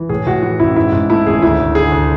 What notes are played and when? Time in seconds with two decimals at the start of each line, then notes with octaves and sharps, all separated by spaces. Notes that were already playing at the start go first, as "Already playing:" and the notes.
Already playing: E3
0.09 A2 G#4
0.26 A2 F#4
0.43 E3 F#4
0.60 A1 E4
0.76 G#2 E4
0.92 G#2
1.10 A3 E4
1.26 G#1 G#4
1.42 D2 E4
1.59 D2
1.75 D3 G#4
1.92 D2